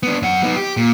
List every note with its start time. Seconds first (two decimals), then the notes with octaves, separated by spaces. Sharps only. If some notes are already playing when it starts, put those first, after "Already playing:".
0.03 B3 D4
0.22 F#2 F#5
0.43 B3 D#4
0.56 G4
0.77 A#2